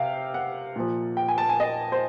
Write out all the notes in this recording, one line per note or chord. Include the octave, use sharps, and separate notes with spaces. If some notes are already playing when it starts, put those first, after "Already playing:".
Already playing: C3 F5 G5
F#5
A#2 F3
G5
G#5
A5
G#5
D#5
C5